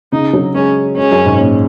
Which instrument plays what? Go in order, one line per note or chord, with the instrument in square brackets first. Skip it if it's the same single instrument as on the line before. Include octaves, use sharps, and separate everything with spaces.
[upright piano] C#3 [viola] D#4
[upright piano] F#3
[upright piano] G#3 [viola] C#4
[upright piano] G#3 [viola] C#4
[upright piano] F#2
G#2
A#2